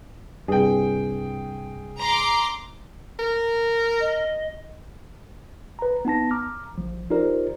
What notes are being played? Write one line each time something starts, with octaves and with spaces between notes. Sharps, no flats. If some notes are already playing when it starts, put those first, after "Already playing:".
C2 G2 G#4 G5
A#5 C6 D6
A#4
D#5
B4 A#5
B3 D#4 A5 A#6
A#5 D6 F6
A1 F3
D#4 F4 G4 A#4 C5 D5